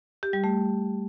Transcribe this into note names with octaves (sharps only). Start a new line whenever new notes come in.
G4
G3
A3